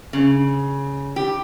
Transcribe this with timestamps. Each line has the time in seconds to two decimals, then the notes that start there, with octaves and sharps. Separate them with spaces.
0.13 C#3
1.16 G4